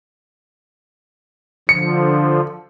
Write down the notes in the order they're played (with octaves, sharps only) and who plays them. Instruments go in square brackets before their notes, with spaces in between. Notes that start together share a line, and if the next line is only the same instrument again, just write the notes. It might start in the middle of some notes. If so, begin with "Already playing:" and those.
[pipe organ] D3 F3 [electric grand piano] C#7